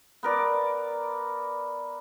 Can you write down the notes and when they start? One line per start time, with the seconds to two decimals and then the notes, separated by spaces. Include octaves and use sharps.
0.23 B3 A#4 D5